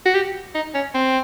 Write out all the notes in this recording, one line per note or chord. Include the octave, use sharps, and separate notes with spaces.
F#4
G4
D#4
C#4
C4